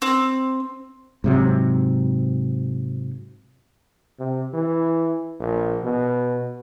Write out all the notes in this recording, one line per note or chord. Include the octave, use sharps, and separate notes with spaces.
C4
G#2 C3 F#3
C3
E3
A#1
B2